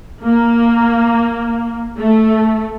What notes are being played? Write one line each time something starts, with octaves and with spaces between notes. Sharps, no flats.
A#3
A3